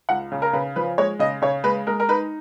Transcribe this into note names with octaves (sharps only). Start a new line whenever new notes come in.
C#2 F#5
C#3
A#4
C#3 B4
F3 B4
G#3 C#5
C#3 D#5
C#3 C#5
G#3 B4
G#3 A#4
A#4
D#4 B4